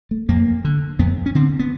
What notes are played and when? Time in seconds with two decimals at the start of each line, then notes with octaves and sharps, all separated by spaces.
0.11 A3
0.29 F2 A#3
0.65 D3
0.99 F2 B3
1.26 C#4
1.35 D3 C4
1.59 B3